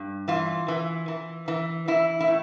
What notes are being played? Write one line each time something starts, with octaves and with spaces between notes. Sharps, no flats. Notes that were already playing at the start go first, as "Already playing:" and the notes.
Already playing: G2
E3 F4
E3
E3
E3
E3 E4
E4
A2